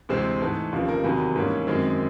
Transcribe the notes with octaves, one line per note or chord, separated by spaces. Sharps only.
D2 C3 E3 G#3 C4 C5
G#2 E3 A3
F1 D#2 C#3 F3
A#4
E2 C3 D#3 F#3 B4
G#2 E3 G3 A#3 C#4
F#2 D#3 G#3 C4